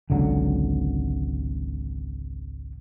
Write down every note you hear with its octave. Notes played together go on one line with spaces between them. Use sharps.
G#1 C#2 D3 F#3